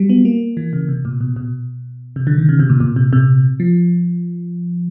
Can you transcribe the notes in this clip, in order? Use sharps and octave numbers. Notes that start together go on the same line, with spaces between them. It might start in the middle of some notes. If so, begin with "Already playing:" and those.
Already playing: F#3 G3
B3
A#3
E3
C#3
C3
A#2
B2
B2
C3
D3
D#3
C#3
C3
A#2
A#2
C3
C3
F3